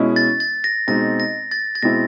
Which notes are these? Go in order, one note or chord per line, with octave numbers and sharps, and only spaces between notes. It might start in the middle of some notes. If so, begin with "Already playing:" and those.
Already playing: B2 G#3 C#4 E4
A6
A6
A#6
B2 G#3 C4 D#4 A#6
A#6
A6
A6
B2 G#3 C4 E4 A#6